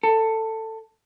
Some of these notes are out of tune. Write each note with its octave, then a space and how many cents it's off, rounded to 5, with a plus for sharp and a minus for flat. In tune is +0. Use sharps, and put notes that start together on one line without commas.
A4 +15